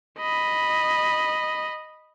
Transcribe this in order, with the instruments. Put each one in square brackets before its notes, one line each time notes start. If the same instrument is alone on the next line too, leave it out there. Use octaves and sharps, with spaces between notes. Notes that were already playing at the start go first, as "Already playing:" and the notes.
[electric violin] D#5 B5